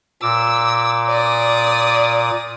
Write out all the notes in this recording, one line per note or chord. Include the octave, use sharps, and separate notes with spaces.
A#2 D6 E6
D5 D#6